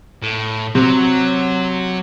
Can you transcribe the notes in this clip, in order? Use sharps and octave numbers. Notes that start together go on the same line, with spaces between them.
A2
C3 F#3